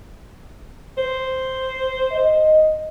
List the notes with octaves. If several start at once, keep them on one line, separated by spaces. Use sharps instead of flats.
C5
D#5